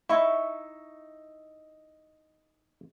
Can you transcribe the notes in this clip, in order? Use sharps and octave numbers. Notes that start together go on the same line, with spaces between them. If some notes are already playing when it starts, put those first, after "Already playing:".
D#4 E4 E5 C#6